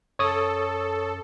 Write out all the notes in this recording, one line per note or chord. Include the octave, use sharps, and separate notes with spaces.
F#2 A4 C#5 D#6